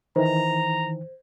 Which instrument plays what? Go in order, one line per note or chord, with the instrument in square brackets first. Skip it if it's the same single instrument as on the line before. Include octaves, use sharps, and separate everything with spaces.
[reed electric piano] D#3 E3 [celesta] C5 [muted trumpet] A#5